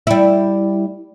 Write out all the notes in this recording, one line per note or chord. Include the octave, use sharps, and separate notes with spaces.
G3 E4